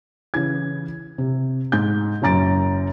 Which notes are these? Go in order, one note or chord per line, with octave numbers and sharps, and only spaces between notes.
C#3 E3 G#6
C3
G#2 G6
F#1 F#2 A#5 A6 D7